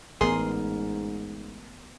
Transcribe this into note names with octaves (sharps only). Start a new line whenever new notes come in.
A1 G#2 B3 G#4 A#4 C6